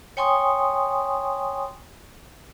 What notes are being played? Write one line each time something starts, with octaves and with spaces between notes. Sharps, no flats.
C#5 G5 G#5 C6 C#6 D#6